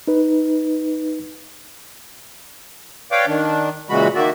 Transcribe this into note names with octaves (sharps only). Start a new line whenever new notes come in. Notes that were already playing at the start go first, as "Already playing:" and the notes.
D#4 B4
B4 C#5 D5 F5 G5 D6
D#3 D4
A#2 C#3 E3 G#3 F#4 B5
D#3 A#3 F#4 D5 E5